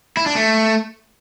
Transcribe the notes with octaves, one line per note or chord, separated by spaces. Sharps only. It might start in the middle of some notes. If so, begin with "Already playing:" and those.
E4
D4
A3